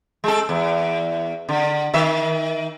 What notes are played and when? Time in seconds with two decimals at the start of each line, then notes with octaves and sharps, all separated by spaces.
0.24 G#3 A4
0.49 E2
1.49 D3
1.94 D#3 E5